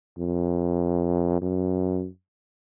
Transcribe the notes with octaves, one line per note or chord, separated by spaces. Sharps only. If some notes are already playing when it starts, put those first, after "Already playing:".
F2
F#2